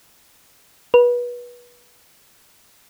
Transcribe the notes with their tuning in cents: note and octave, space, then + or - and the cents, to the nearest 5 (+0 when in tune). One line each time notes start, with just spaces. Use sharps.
B4 -25